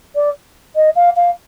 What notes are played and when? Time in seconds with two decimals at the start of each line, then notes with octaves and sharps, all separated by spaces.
0.15 D5
0.75 D#5
0.95 F5
1.16 F5